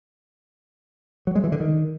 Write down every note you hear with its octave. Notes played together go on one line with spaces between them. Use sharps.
F#3
G#3
E3
D3
D#3